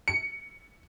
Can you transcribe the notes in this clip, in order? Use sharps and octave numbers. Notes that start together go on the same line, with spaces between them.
C#7